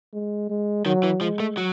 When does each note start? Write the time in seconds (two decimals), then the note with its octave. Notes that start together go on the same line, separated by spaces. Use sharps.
0.13 G#3
0.50 G#3
0.86 D#3 F#3
1.03 E3
1.21 F3 G#3
1.40 A3
1.57 F#3